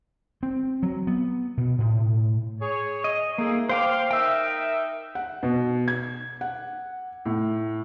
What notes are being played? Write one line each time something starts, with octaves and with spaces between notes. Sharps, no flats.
C4
F#3
B3
B2
A2
G#4 C#5
D#5
A3 A#3 D#4 G#4
C5 F5 G5 D6
D#4 A#4 E5 G5 E6
F#5
B2
G#6
F#5
A2